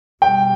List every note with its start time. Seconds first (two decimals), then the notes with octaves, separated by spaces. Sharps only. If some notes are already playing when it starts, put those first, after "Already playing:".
0.22 B2 G3 G5